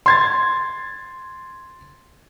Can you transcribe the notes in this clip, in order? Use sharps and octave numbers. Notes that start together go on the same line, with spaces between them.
C6 G#6 A6